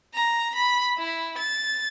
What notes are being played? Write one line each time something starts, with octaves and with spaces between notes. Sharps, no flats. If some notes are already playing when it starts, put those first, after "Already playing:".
A#5
B5
E4
A6